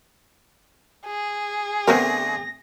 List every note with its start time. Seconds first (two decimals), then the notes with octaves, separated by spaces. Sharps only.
1.06 G#4
1.88 D3 A3 B3 C4 A#4 A#6